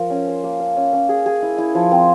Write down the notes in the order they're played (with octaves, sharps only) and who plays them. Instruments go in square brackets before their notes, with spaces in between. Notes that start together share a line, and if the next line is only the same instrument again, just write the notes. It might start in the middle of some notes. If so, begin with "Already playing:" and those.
Already playing: [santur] F3 A#4
C#4
C5
A#3
F5
C#4
C#4
G#4
G#4
E4
E4
F3
C4